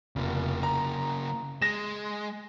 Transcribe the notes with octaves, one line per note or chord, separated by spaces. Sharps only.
F1 C#3 A#3
A#5
G#3 A#6 E7